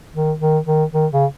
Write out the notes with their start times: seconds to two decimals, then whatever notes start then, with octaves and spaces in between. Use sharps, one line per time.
0.14 D#3
0.40 D#3
0.66 D#3
0.93 D#3
1.12 C#3